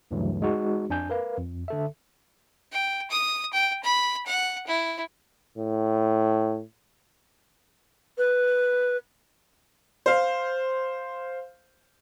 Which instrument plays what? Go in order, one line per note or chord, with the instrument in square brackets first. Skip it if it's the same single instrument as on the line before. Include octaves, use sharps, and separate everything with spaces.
[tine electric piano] D2 G2 C#3 E3 F#3 A3
G#3 D#4 F#4 G#4
F2 D4 G#5 G6
A#4 B4 F5
F2
D3 A4 E5
[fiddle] G5
D#6
G5
B5
F#5
E4
[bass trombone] A2
[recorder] B4
[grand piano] C5 F5